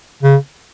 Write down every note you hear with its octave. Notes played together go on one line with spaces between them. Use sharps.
C#3